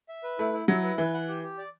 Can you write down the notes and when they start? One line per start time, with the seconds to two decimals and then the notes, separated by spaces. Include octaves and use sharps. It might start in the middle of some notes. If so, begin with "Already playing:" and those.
0.09 E5
0.24 B4
0.39 A3 E4
0.53 E4
0.68 F#3 E4
0.83 B4
0.98 E3 B4
1.14 F#5
1.28 G4
1.43 G4
1.58 D5